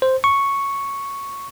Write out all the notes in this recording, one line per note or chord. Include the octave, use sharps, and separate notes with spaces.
C5
C#6